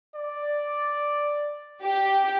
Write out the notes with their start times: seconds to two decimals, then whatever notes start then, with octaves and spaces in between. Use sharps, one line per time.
0.15 D5
1.82 G4